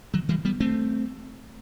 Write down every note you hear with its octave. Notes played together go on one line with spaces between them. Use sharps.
D#3 F#3
E3 G3
G3 B3
A3 C4